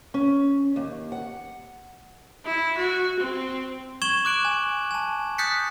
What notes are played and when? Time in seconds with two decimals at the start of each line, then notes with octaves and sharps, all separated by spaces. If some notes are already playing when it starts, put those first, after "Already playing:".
0.14 C#4
0.76 D#2
1.12 F#5
2.45 E4
2.78 F#4
3.20 C4
4.02 C#6 G#6 E7 F#7 G7
4.25 D6 F#6 D7 F#7
4.45 G#5
4.91 G#5 A5
5.38 D#6 F#6 G6 A6 B6 C#7